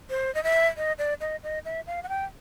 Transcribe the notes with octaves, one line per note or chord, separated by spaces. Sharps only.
C5
D#5
E5
D#5
D5
D#5
D#5
E5
F5
F#5
G5